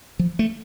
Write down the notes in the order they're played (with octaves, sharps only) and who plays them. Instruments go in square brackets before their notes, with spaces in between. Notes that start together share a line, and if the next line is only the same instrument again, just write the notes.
[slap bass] F3
A3